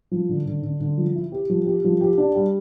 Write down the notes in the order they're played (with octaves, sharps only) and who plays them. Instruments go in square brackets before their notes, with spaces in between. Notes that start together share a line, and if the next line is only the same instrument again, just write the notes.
[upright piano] F3
D3
D3
D3
D3
F3
E4
G4
F3
G4
F3
G4
D4
G3